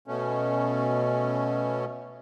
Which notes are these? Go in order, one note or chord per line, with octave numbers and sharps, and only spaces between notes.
B2 A3 C#4